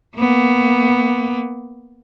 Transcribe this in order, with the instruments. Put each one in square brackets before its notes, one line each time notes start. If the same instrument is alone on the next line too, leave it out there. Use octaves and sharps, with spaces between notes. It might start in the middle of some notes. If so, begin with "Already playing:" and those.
[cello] A#3 B3